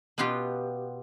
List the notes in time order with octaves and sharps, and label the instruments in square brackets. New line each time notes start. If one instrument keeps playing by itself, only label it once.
[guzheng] B2 B3 F4 G4